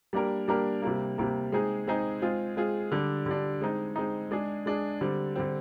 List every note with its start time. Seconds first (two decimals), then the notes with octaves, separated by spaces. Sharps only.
0.13 G3 A#3 D4 G4 A#4
0.48 G3 A#3 D4 G4 A#4
0.82 C3 G3 A#3
1.18 C3 G3 A#3
1.52 G#3 C4 D#4 G#4
1.87 G#3 C4 D#4 G#4
2.22 G#3 C4 F4 G#4
2.57 G#3 C4 F4 G#4
2.91 D3 G3 D4
3.26 D3 G3 D4
3.61 G#3 C4 D#4
3.96 G#3 C4 D#4
4.31 G#3 D4 G#4
4.66 G#3 D4 G#4
5.01 D3 G3 C4
5.36 D3 G3 C4